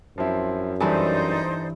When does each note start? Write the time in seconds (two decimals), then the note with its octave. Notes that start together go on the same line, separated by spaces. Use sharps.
0.18 F#2 F3 C4 E4
0.80 G2 E3 D#4 A4 C5 D5 G#5 A5